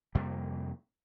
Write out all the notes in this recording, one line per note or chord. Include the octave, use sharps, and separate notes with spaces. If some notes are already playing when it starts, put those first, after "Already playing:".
F2 C3 G3 A#3